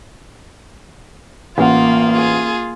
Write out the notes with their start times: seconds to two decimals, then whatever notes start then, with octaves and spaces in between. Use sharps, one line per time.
1.58 A1 A#3 F4 F#5
2.13 F4 G#4